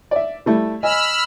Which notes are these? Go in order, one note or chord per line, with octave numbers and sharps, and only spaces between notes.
D5 E5
G3 A3 E4
D#5 G#5 B5 E6 F6